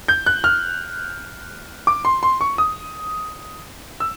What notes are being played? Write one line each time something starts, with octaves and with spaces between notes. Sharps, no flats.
G6
F#6
F6
D6
C6
C6
C#6
D#6
E6